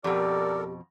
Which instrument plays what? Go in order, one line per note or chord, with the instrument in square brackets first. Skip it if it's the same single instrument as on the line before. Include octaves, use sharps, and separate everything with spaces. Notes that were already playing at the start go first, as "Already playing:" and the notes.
[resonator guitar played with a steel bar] F2 B2 [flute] G4 [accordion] A4 A#4 [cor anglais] D5